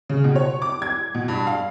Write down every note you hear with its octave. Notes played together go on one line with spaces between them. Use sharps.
C#3
B2
C#5
D6
G#6
B2
G2
F5